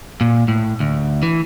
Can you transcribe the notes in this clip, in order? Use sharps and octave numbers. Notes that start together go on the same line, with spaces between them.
A#2
A2
D2
E3